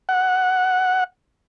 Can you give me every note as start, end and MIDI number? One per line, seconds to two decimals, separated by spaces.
0.09 1.04 78